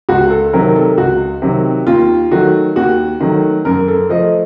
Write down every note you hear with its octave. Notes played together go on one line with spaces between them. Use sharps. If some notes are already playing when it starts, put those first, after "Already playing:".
C#2 F#4
A4
C3 D#3 F#3 A#4
A4
C#2 F#4
C3 D#3 F#3
D#2 F4
D#3 F#3 A3 F#4
D#2 F#4
D#3 F#3 A3
F#2 A#4
A4
F3 A3 D#5